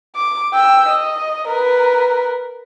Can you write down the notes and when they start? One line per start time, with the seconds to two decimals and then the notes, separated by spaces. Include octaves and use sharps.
0.15 D6
0.53 G5 E6
0.89 D#5
1.48 A#4 B4